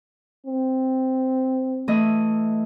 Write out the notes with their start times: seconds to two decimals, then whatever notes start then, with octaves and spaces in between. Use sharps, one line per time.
0.47 C4
1.88 E3 A3 D#5